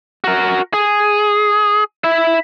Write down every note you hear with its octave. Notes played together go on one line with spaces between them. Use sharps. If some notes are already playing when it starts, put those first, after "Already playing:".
F#4 A#4
G#4
E4 E5